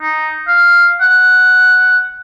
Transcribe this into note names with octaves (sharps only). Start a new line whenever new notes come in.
D#4
F5
F#5